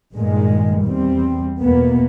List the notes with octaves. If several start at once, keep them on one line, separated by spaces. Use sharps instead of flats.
G2 A#2 D#3 G#3
E2 G3 C4
E2 B2 A#3 B3